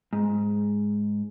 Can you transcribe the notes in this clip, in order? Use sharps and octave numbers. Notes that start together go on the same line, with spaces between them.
G#2